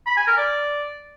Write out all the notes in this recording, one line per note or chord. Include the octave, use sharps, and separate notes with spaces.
B5
G#5
A#4
D5